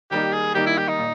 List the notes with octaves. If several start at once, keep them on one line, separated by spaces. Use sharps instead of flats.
D#3 G3 A#3 D#4 G4
G#4
D#3 G3 A#3 D#4 G4
E4
G4
D#4
A#2